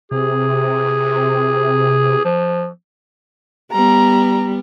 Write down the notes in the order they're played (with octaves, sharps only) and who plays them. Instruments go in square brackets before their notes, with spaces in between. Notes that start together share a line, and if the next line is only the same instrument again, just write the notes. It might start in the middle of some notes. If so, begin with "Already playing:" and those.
[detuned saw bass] C3 [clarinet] G#4
[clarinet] F3
[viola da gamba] G3 B3 [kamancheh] A#5